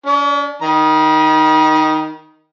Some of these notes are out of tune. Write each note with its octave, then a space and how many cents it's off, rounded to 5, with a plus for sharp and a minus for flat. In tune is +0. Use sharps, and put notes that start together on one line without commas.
C#4 +45 D5 +0
D#3 +0 B5 -45